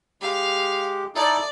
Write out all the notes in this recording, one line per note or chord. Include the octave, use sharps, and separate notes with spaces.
G#3 G4 F5
D#4 E4 A4 D5